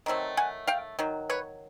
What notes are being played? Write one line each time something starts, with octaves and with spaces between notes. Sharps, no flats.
D#3 F#3 A3 C4
F#5 G#5
F5 G5
D#3 F#3
B4 C#5